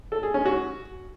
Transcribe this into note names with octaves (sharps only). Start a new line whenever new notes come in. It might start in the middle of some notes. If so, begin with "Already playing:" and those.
A4
G#4
C#4
F#4